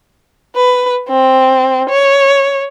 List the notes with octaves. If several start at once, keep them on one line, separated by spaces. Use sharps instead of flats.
B4
C4
C#5